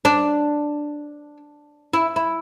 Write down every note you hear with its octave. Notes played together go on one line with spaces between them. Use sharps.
D4
E4
E4